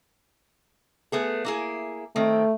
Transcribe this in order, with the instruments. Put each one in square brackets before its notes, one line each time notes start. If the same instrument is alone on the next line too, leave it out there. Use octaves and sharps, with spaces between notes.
[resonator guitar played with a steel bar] A3 B3 G#4
A#3 E4 G#4
[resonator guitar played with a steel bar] D#3 C4 [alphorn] A3